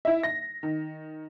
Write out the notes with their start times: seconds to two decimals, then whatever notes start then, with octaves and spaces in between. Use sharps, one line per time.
0.05 E4 E5
0.23 A#6
0.63 D#3